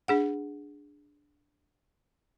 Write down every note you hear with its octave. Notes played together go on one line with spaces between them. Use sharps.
D4 G#4 F#5